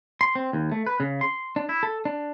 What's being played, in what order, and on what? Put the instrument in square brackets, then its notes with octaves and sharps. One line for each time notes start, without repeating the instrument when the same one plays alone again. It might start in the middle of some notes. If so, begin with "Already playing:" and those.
[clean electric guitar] C6
C4
D#2
A3
B4
C#3
C6
D4
E4
A4
D4